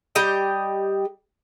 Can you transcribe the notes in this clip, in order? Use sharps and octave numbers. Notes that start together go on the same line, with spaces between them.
G3 G4 D#5 G5